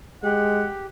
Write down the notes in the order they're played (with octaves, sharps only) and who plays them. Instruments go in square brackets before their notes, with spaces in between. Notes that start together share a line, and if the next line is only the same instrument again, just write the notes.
[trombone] G#3 [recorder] G4 [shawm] F#5